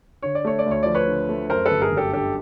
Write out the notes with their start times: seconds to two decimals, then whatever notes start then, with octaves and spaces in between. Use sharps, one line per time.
0.23 D3 C#5
0.35 D5
0.45 A3 C#5
0.59 D5
0.66 D2
0.71 C#5
0.83 F3 D5
0.95 B4 C#5
1.08 D3
1.29 A3
1.50 F#2 A#4 C5
1.66 A4 B4
1.71 G1
1.82 G#4 A#4
1.92 G1
1.97 G4 A4
2.13 D3 G4 A4